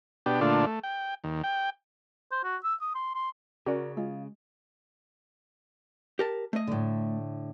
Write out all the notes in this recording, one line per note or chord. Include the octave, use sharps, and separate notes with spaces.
B2 D4 G4
A#2 D3 A3 D4 F4
A3
G5
D#2
G5
C5
F#4
E6
D#6
C6
C6
C#3 C#4 F#4 A#4 D5
G#3 F4
G4 A#4 A5
A3 D#5
A2 D3